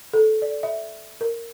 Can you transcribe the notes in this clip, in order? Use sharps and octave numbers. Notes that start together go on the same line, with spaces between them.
A4
D5
E5
A#4